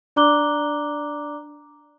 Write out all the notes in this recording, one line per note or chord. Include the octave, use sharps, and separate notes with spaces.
D4 D5 A#5 D6 F#6 G7